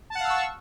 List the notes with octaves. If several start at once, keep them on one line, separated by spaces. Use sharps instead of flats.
F5 F#5 A5 C#6 E6